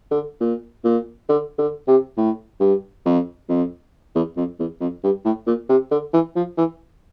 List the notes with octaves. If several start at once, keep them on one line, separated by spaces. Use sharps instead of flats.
D3
A#2
A#2
D3
D3
C3
A2
G2
F2
F2
E2
F2
E2
F2
G2
A2
A#2
C3
D3
E3
F3
E3